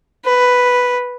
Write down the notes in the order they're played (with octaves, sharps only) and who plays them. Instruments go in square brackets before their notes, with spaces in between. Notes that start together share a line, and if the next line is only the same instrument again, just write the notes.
[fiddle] B4